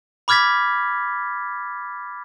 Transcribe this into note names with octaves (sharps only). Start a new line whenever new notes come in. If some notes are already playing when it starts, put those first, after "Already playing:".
B5 D6 F6 G#6 A6 B6